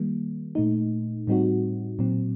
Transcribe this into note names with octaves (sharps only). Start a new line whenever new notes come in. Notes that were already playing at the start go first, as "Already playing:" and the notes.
Already playing: D#3 G3 A#3
A#2 A3 D#4
A2 G3 C4 D#4 F#4
A#2 F#3 C4